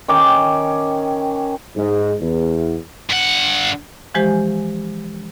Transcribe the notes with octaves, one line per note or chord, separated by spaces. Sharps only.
D#3 C#4 G5 D6
G#2
E2
G2 F#5
E3 F3 G#3 G4 C5 G#5